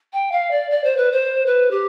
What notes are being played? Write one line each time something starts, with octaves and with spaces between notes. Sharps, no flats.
G5
F5
D5
D5
C5
B4
C5
B4
G4